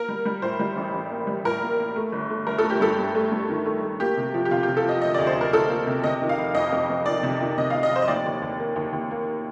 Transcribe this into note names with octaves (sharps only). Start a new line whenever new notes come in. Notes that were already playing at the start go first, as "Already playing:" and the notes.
Already playing: A#3 A#4
G3
G3
A2 C5
G3
A1
A1
A#3
G3
A2 A#4
A#3
A#3
A3
G1
A3
G1 A#4
A3 A4
G4
G2 A4
G2
A3
G2
D#3
A3
A3
A#3 G4
C3
F3
G4
C3 F4
G4
C3
A4
F3 D#5
D2 D#5
D5
D2
C5
D2 A#4
D2 A4
A#3
C3
C3 D#5
D#3
F5
F1
F2 D#5
F2
F2
D#3 D5
C3
D#3
C3 D#5
F5
C3
D#5
F1 C5
D#5
D#2 D5
D#2
D#2
A#3
D#2
D#2
A#3